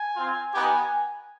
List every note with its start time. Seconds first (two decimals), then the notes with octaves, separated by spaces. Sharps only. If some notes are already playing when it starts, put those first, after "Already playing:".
Already playing: G#5
0.16 C4 F4
0.52 B3 D#4 G4 G#5